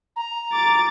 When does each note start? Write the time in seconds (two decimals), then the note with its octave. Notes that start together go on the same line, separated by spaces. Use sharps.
0.16 A#5
0.53 D6 A6